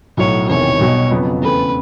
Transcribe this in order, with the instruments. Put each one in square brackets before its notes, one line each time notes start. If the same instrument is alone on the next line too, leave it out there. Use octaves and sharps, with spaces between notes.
[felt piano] B1 A2 F#3 [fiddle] C#5
[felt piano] E1 E2 C3 D#3 [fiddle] C#5
[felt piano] B1 B2 G3
F2 C#3 F#3 B3
[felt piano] E2 C#3 E3 A3 C4 [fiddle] B4